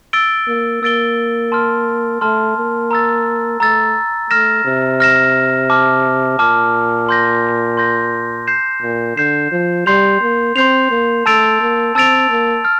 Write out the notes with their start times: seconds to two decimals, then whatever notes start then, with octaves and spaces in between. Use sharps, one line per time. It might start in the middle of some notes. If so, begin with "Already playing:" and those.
0.13 E6 A6 D7 G7
0.48 A#3
0.82 A#3 E6 A6 D7 G7
1.52 A5 C6 F6
2.21 A3 A5 C6 F6
2.57 A#3
2.91 A#5 E6 A6
3.60 A3 A#5 E6 A6
4.30 A3 F6 A#6 E7
4.65 C3
5.00 F6 A#6 E7
5.70 A5 D6 F6
6.39 A#2 A5 D6 F6
7.09 C6 G6 A#6
7.77 C6 G6 A#6
8.47 G6 C7 E7
8.82 A#2
9.17 D3 G6 C7 E7
9.52 F3
9.86 G3 C6 G6 C7 F7
10.21 A#3
10.56 C4 C6 G6 C7 F7
10.91 A#3
11.26 A3 A5 E6 A6 D7 F7
11.61 A#3
11.95 C4 A5 E6 A6 D7 F7
12.30 A#3
12.65 F6